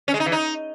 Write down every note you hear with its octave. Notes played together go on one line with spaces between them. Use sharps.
C#4
G#3
D#4
E3
D#4